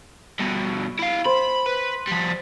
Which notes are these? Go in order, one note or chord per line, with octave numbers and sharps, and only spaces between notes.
G2 B2
E4 F5
C5 B5
B4
F3 G3